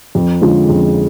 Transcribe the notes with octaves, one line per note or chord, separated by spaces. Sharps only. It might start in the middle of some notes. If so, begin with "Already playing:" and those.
F2
D3 G#3 C#4 F4
F2